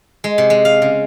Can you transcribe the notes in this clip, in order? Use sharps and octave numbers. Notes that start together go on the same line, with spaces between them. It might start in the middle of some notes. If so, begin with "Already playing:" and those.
G#3
C3
G#3
F5
C#3